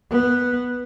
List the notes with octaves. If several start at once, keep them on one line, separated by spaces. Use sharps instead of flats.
B3